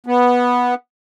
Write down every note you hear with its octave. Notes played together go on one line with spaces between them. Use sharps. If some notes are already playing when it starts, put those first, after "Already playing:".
B3